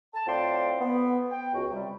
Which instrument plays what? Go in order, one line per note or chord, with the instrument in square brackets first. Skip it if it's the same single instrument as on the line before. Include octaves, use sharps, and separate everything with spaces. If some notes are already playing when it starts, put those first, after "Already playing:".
[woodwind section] A5
A2 C4 F4 D5 G5 C6
B3
G5
C#2 F#4
C3 G3